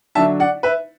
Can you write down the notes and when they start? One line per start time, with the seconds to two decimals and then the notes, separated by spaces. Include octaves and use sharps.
0.15 D3 F#3 D4 E5 A5
0.40 D5 F#5
0.63 B4 E5